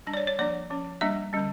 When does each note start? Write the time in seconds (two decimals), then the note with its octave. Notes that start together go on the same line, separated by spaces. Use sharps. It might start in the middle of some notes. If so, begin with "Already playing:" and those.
0.07 G3 D4 A5
0.14 D5
0.17 C#5
0.27 C#5
0.39 F3 A#3 D4 D5
0.70 F3 C#4
1.01 G3 A#3 D4 E5
1.33 D3 G3 C#4